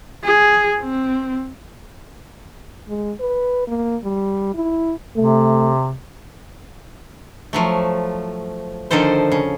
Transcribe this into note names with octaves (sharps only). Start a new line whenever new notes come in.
G#4
C4
G#3
B4
A#3
G3
E4
C3 A3
F3 F#3 A3
D3 D#3 F3 A4 C5
C#3